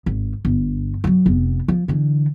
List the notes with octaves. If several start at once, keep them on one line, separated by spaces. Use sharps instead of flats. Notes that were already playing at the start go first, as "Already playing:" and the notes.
G#1
G1
F3 F#3
F1 B3
F3
D3 E3